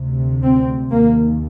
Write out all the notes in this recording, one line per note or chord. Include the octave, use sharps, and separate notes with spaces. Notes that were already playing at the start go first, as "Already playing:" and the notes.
Already playing: D2 C3
C4
D#2 A#3